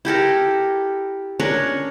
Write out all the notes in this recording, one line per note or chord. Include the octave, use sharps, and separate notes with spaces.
E4 G4 A4 A#4
C#4 D4 A#4 C#5